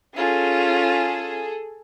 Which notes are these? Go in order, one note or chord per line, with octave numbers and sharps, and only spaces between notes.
C#4 F4 G#4 A4